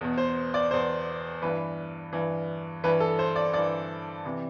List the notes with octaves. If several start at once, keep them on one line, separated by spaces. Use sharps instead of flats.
E2 B2
C5
D5
E2 B2 C5
G2 E3 B4
G2 E3
G2 E3 B4
A4
C5
D5
G2 E3 D5
C3 E3